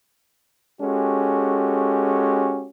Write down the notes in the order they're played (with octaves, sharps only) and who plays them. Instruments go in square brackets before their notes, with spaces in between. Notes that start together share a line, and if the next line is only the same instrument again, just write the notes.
[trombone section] G#3 C#4 F#4 G4 A4